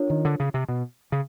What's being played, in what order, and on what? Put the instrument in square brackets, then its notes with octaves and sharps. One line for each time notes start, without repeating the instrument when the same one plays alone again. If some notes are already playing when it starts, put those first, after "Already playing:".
Already playing: [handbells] D4 F4 A#4 C#5
[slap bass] D#3
D3
C#3
C3
B2
C#3